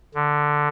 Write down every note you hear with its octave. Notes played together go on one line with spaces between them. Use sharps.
D3